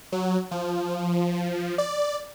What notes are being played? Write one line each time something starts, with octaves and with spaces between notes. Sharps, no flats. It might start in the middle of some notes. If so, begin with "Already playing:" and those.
F#3
F3
D5